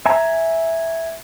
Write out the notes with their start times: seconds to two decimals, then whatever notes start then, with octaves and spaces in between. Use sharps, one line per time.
0.06 E5 G#5 A#5